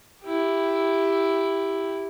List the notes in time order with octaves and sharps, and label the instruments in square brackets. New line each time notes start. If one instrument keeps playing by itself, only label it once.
[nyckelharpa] E4 G4